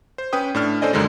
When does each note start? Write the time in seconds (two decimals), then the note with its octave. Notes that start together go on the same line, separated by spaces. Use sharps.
0.18 C5
0.33 C#4 B4 G5 D#6
0.55 A2 D4 F6
0.81 C#4 A4 C5 D5 D#5 G#5
0.93 C#2 F#2 D3 D#3 G#3